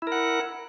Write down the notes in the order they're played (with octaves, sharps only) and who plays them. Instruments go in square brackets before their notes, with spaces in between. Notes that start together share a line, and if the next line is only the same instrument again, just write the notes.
[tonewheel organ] E4
A#4
F#5